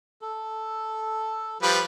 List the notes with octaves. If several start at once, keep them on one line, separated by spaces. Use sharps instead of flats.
A4
F3 G3 B4